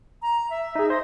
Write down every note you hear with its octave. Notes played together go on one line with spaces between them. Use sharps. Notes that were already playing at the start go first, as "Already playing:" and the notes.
A#5
E5
D#4 G#4
C5 D#5